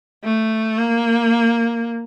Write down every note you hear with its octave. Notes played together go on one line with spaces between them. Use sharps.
A3
A#3